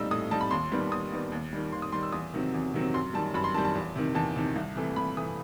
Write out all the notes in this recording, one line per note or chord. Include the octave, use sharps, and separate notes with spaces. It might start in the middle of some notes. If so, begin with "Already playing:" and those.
Already playing: A2 G3 D#4 E6
A2 D#6
G3 D#4 A5
B5
D#2 C6
D#3 G3 B3
D#2 D#6
D#3 G3 B3
D#2
D#3 G3
D#2 C6
D#6
D#3 G3 C6
E6
E2 D#6
C3 D#3 F#3 C4
E2
C3 D#3 F#3 C4
F#2 C6
D#3 G3 A5
F#2 B5
C6
D#3 G3 A5
A5
E2
C3 D#3
E2 A5
C3 D#3
C2
C3 E3 A3
C2 B5
C3 E3 A3 D#6